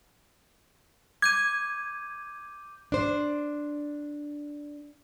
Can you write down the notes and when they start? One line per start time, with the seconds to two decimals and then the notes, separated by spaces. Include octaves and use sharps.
1.22 D6 G6 G#6 D#7
2.92 D4 C5